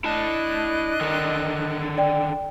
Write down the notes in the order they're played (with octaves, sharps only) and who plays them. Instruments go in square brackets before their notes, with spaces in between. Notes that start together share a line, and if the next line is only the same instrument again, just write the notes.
[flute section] D4 D#5 F#6 [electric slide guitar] E4 A5
[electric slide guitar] D3 D#3
[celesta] D5 G5